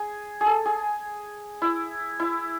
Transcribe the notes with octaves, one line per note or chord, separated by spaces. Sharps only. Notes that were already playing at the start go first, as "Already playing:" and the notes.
Already playing: G#4
G#4
A4
G#4
E4
E4